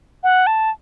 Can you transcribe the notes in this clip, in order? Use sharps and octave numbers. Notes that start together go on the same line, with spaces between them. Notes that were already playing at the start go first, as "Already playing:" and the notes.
F#5
A5